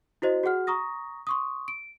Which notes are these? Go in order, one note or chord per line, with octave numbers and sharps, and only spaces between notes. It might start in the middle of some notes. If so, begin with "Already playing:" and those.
E4 F#4 C5 D#5
F#4 G#4 F#5 F6
A#5 C#6 D#6 A#6
C6 C#6 D#6
D7